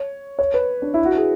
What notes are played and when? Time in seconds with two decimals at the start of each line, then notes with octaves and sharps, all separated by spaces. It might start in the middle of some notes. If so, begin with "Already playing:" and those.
Already playing: C#5
0.39 C#5
0.54 B4
0.82 D4
0.94 E4
1.05 F#4
1.17 G#4